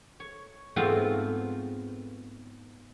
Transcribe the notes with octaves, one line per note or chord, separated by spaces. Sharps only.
C#5
G#2 A3 B3 C4 F4